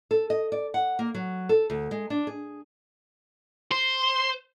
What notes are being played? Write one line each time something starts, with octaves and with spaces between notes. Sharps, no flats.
A4
D#5
D5
F#5
A#3
F#3
A4
D2
G#3
D4
G#4
C5 C6